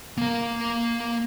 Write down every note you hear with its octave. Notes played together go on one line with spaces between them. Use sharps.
A#3 F5